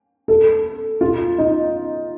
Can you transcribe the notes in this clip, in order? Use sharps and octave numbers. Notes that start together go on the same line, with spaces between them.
A4
F4
D#4